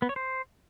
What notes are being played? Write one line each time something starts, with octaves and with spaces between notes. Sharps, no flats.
B3
C#5
C5